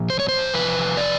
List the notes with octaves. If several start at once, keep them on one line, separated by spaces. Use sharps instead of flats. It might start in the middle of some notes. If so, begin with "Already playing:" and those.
Already playing: A#2 F3
C5
C#5
C5
E2 C3 F3 B4
D5